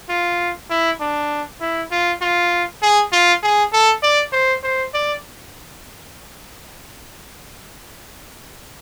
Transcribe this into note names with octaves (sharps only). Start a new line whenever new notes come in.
F4
E4
D4
E4
F4
F4
G#4
F4
G#4
A4
D5
C5
C5
D5